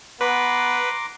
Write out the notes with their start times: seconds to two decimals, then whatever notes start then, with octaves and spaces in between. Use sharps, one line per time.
0.21 B3 B4 A#5 C6 D6